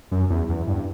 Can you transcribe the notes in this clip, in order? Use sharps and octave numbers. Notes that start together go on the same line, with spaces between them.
F#2
E2
E2
G2